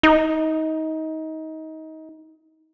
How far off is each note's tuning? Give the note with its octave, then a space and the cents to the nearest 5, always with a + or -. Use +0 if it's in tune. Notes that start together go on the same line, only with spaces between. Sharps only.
D#4 +25